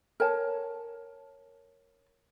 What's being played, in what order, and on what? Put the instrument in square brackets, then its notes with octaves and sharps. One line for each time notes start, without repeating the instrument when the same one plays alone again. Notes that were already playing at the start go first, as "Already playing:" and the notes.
[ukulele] A#4 C#5 G#5 A5